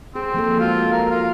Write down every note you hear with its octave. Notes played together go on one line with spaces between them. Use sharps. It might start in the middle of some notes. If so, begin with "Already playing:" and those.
C4 G#4
F3 A#3 A4
G#3 F4 F#4
A#4
F4